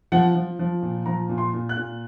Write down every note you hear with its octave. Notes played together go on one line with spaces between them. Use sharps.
F3 F#5
F3
F3
A#2
F3 A#5
A#2
C6
A#2
F#6
A#2